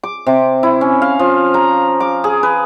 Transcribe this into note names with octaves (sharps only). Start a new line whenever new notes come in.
D6
C3
E4
C#4
F5
F3
A#5
D6
G#4
B4